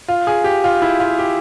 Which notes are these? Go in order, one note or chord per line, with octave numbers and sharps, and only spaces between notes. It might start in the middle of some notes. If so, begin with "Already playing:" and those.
F4
G#4
G4
F4
E4
F4
G4